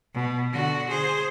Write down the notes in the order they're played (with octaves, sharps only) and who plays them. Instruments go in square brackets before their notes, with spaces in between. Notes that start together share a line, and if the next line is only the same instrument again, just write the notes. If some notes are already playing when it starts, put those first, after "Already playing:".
[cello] B2
D3 F#4
G#4 C5